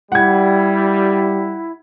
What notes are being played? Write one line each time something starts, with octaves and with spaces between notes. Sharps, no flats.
G3 E4 F#5 G#6